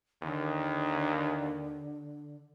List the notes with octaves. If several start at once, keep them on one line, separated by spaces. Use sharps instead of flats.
D#2 D3